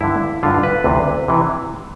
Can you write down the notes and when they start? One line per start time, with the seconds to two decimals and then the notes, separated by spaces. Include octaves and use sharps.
0.01 G2 D3 E4
0.43 G2 D3 F4
0.63 B4
0.84 D2 C3 E3
1.28 C3 E3